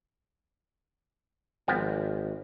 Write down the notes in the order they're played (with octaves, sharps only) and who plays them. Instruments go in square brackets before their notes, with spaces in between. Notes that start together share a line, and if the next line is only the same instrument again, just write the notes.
[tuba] G#1 [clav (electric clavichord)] F3 B3 C4